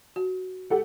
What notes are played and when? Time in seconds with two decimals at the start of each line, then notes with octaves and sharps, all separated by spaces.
0.16 F#4
0.70 G4 A4 F#5